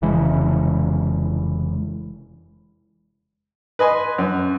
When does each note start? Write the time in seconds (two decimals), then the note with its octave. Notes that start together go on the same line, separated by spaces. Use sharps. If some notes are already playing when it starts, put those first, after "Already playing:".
0.02 F1 C#3 E3 G#3
3.79 B4 D#5 G#5 C6
4.18 F#2